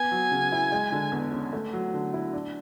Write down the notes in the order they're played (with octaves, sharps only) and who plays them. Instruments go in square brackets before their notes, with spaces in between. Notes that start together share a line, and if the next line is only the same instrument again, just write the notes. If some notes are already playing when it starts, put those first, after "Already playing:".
Already playing: [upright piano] B3 [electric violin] G#5
[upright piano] F#3
C#3
E4
G#3
D3
E2
C#4
A3
F#3
D3
E4
D4